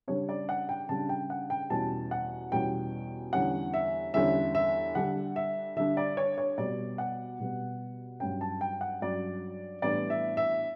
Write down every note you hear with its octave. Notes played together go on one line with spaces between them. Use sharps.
C#3 G3 D4 C#5
D5
F#5
G5
C#3 G3 D4 A5
G5
F#5
G5
E2 B2 G3 C#4 A5
F#5
E2 B2 G3 C#4 G5
E2 D3 G3 C#4 F#5
E5
E2 D3 G3 C#4 E5
E5
D3 G3 D4 F#5
E5
D3 G3 D4 E5
D5
C#5
C#5
B2 G3 B3 D5
F#5
B2 G3 B3
G2 F#3 C#4 G5
A5
G5
F#5
G2 F#3 C#4 D5
A2 E3 G3 B3 D4 D5
E5
E5